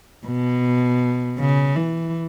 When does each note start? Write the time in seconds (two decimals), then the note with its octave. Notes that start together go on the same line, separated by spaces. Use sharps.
0.27 B2
1.39 C#3
1.76 E3